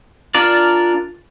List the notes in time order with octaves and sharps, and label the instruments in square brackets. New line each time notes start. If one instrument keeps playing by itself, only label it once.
[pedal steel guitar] D4 F4 A#4 D5